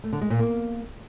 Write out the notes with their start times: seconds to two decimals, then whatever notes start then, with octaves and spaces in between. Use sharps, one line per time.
0.04 A3
0.12 D3
0.21 G#3
0.30 A#2
0.39 A#3